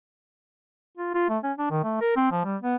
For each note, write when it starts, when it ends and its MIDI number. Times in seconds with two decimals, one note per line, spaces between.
0.97 1.11 65
1.15 1.28 65
1.30 1.38 57
1.43 1.52 61
1.58 1.69 62
1.71 1.82 51
1.84 2.00 57
2.01 2.15 70
2.17 2.30 60
2.32 2.41 53
2.45 2.57 55
2.62 2.76 59